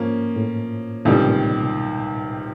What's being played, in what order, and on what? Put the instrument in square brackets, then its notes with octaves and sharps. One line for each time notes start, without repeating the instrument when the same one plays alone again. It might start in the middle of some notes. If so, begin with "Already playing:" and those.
Already playing: [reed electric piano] G#2 [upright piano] F3 A#3 C#4
[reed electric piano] A2
[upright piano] C#2 C3 D#3 G3 [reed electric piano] A2
[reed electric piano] A#2
B2